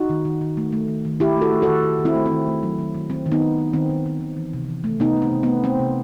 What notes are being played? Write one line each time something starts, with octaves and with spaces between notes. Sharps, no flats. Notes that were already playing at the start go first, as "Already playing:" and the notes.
Already playing: D#4 F#4
D#3
D#3
D#3
A3
A3
D#3
D#3
D#3 E4 G4
A3 F#4 A4
A3
F#4 A4
D#3
D#3
D#3
C4 E4
A3
C4
D#3
A3
F#3
D#3
D#3
D#3 C4
D#3
B3 D#4
D#3
D#3
D#3 C4
D#3
D#3
D#3
E3
C3
E3
A3
C3 B3 D#4
A3
C4
C3
B3
A3
A3 C4
C3